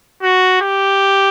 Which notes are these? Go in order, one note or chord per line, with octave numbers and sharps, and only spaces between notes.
F#4
G4